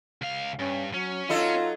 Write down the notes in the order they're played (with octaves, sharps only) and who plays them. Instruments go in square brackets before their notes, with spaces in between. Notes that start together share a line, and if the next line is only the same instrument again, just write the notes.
[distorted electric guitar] C#2 F5
[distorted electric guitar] G2 [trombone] C#4
[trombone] F#3 [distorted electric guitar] C#4
[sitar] F#3 D#4 A4 [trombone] F4